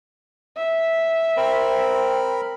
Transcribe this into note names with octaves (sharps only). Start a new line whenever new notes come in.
E5
C4 A#4 B5